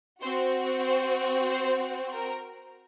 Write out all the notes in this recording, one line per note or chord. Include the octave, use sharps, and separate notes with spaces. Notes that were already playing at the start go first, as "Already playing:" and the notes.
C4 F#4 C5
C5
C5
A#4